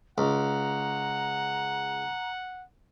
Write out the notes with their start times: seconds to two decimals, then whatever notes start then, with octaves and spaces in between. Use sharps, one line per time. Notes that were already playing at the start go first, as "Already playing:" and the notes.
0.18 C#2 F#5 A#5